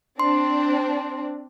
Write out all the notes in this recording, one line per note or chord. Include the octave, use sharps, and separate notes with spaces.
C4 D4 C6